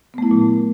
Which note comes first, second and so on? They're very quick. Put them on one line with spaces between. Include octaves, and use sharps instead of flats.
B3 A3 E4 F#3 A#2